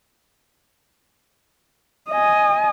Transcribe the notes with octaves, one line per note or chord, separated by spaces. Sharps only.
D#5 G#5